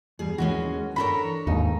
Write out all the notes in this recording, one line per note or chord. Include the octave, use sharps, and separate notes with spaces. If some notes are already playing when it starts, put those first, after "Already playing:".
E2 G3 G#4
D#2 E3 G#3 C#4 F#4
D4 A4 A#4 C#5 A#5 B5
D#2 G#2 D#4